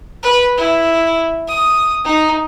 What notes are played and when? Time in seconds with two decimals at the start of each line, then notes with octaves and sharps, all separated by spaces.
0.23 B4
0.58 E4
1.48 D#6
2.05 D#4